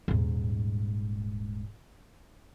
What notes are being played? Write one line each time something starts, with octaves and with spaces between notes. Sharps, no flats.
D#1 G#2